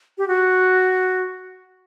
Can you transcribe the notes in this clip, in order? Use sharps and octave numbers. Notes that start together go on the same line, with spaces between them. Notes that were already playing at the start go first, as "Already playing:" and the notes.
G4
F#4